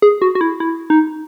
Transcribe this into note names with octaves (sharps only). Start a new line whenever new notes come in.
G#4
F#4
F#4
E4
E4
D#4